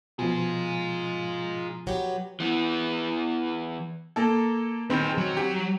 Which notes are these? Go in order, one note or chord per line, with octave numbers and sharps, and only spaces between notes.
B2 F3 D#4 F4 G#4
F#3 B3 G4
E3 B3
A#3 A4
D#3 C4 G#4 B4
F#3
G4